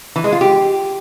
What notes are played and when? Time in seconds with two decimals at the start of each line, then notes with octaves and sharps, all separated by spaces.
0.16 E3
0.24 G#3
0.32 F4
0.41 G4